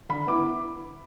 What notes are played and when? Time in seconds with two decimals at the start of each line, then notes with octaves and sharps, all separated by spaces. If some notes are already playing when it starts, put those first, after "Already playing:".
0.09 D3 B5
0.27 B3 E4 D6